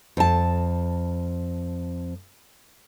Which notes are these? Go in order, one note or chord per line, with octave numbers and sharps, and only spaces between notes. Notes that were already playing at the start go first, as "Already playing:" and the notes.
F2 A5